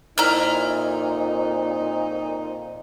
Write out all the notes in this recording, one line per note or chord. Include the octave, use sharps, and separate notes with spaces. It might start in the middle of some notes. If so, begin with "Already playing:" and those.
F2 A#2 D#4 E4 A#5 F6